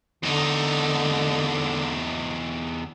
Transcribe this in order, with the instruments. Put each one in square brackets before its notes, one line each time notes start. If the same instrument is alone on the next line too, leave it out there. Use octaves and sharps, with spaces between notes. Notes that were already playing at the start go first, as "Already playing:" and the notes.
[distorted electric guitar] E2 D#4 [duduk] D3